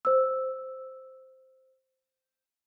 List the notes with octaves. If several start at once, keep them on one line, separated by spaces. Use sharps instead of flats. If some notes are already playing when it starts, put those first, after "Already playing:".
C5 E6